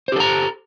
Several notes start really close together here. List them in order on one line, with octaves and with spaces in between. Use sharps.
C5 G4 A4 A#5